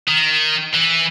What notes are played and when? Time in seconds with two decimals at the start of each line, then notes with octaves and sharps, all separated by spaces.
0.08 D#3
0.74 E3